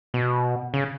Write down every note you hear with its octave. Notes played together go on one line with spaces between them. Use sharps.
B2
C#3